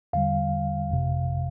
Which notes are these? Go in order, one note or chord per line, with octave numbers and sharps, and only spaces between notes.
E2 D3 G3 F5
G1 F2 C3